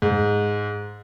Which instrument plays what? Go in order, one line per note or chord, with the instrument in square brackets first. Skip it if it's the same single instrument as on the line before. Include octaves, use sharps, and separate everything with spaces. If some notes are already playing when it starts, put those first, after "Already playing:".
[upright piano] G#2